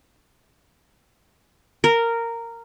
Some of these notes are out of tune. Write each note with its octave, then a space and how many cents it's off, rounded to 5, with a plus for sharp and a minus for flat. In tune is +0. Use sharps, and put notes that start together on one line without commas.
A#4 -10